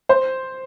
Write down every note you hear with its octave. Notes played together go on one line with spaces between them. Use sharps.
C5